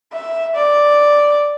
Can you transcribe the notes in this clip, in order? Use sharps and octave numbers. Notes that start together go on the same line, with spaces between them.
E5
D5